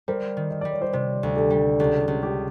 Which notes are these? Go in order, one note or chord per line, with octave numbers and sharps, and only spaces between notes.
G3 A#4 C5
D#3
D#5
G3 D5
C#5
C5 D5
C3 C5 D5
D2
G4 A4
G3
C#2 G4 A4
G4
C#2
G4